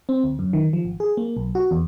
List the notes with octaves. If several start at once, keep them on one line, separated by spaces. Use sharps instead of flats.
C4
D2
F#2
D#3
F3
G#1
G#4
A#3
B1
F#4
E2